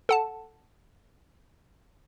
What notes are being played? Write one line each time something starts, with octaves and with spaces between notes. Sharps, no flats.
A4 F#5 A5